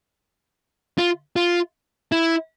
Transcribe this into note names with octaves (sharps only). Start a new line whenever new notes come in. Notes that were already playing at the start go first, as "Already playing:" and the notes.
F4
F4
E4